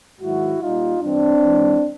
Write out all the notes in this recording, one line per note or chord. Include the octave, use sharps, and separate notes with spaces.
G#2 D#3 F#3 E4 F#4
A#2 G3 D#4 F4
G2 E3 G3 C4 D4
G#2 E3 G#3